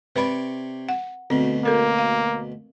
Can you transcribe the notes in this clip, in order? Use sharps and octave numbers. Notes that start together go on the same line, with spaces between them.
C3 B4 C#5 D5 B5
F#5
D2 B2 C4
A#3 A4 A#4
F5